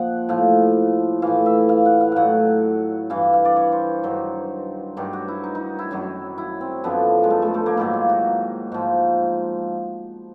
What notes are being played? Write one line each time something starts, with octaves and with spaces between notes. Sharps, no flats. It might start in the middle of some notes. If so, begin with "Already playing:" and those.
Already playing: A#2 F3 D#5 F#5
A2 F3 F5
A2 E3 F5
E5
F5
F#5
F5
A2 F#3 F5 F#5
G2 E3 F5
F5
D5
C#5
C5
G2 D#3 F#3
G2 D#3 F#3 G4
F#4
E4
D#4
D#4
E4
F#2 D#3 F#3
E4
C4
F#2 D3 F3 B3
G#3
A3
G#3
A3
A#3
G#2 D#3 F#3 E4
F4
F#4
G#2 F3